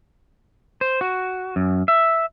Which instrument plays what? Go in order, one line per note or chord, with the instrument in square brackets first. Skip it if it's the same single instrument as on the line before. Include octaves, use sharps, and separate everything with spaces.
[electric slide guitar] C5
F#4
F#2
E5